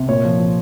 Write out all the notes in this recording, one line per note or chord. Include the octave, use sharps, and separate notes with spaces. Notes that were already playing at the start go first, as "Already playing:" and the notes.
Already playing: C3
A#2 C#5
F3
F3